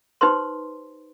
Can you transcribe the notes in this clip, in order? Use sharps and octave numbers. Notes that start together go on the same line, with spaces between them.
D#4 G4 B4 C5 C6